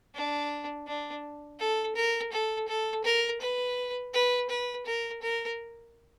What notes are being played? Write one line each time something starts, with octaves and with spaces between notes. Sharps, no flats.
D4
D4
A4
A#4
A4
A4
A#4
B4
B4
B4
A#4
A#4